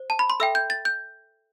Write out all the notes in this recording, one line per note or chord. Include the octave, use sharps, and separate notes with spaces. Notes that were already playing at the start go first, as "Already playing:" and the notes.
Already playing: C5
A5
B5
C6
A4 E5 G5 E6
G6
A6
G6